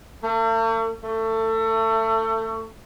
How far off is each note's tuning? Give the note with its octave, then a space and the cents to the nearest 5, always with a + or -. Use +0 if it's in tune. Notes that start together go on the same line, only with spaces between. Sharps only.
A3 +45
A3 +25